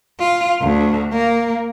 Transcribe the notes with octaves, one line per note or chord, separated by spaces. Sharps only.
F4
D2
A#3